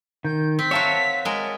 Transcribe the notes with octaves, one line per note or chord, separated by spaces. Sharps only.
D#3 G6
C4 B6
F#4 A#4 C#5 E5 F5 A5
G#3 A#4